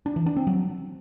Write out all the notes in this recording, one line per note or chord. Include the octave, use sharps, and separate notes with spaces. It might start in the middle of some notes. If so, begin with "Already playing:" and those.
D4
E3
D4
C4
F#3